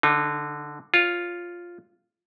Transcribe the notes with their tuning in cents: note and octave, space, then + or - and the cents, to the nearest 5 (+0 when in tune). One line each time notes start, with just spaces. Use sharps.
D3 +0 D#4 -30
F4 +0 C#5 +0